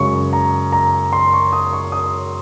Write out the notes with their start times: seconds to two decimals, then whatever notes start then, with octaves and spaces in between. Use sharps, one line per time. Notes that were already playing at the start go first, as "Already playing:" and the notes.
Already playing: F#2 C#3 G#3 C#6
0.33 A#5
0.72 A#5
1.13 C6
1.33 C#6
1.53 D#6
1.73 C#6
1.92 D#6